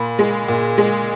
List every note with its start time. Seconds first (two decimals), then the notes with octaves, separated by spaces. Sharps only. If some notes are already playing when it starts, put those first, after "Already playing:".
Already playing: A#2 B5
0.19 G#3
0.48 A#2
0.78 G#3